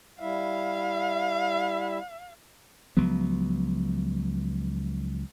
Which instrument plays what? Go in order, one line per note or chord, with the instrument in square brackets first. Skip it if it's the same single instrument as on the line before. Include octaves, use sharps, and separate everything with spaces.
[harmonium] G3 E4 E5 [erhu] F5
[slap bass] C#2 F3 F#3 B3